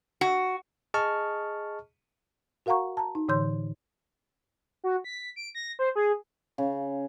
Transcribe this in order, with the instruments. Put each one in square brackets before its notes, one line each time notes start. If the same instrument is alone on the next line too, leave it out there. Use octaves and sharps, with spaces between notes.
[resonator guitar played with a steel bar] F#4
[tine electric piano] G#4 D#5 A5 C#6 F6
[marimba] F#4 A#4 F5 F#5 A#5 C#6
A5 A#5
D#4
A2 D3 E3 C#5 C6 G6
[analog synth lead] F#4
B6
D7
A#6
C5
G#4
[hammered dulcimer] C#3